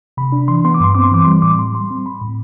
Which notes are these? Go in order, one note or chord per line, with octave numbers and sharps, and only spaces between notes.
C3 B5
D4
E3 C6
B3 C6
D6
G2 C6
C4 D6
C6
E3 D6
G3 C6
A2 D6
A2 C6
G3 C6
C4
A2 B5
A2